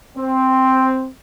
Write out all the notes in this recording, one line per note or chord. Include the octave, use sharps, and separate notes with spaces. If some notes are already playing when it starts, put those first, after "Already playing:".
C4